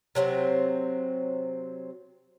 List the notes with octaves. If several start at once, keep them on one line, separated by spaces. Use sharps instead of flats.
C3 F#3 A3 C4